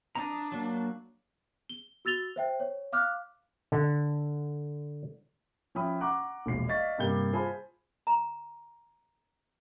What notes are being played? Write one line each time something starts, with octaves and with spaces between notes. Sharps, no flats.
D4 A#5 D#6
F#3 A#3
G7
F#4 E6 A6 F7 G7
C5 E5 G5
C#5
F5 D6 F6 F#6
D3
F3 C#4 E5 G5 B5 D#6
F#5 A#5 C#6 D6 F#6
E1 A#1 C7
D5 D#5 F5 C#6 A6 B6
G2 C3 G3 A#3 G6 G7
F4 G#4 C5 G#5 A5 B5
A#5